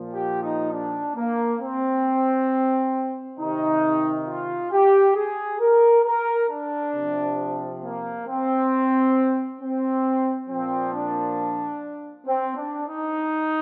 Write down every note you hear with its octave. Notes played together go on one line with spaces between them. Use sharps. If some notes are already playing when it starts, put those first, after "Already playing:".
Already playing: A#2 F3
G4
D#4
D4
A#3
C4
C3 D#3 D#4
F4
G4
G#4
A#4
A#4
D4
C3 F3
A#3
C4
C4
A#2 F3 C4
D4
C4
D4
D#4